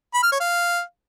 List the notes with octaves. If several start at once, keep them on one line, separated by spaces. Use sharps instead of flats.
B5
F6
C#5
F5